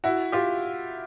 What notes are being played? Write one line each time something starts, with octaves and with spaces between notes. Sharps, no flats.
E4 F#4
F4 G4